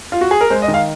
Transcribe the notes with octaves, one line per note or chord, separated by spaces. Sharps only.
F4
F#4
G#4
A#4
G#3 C5
D#5
D#3
F5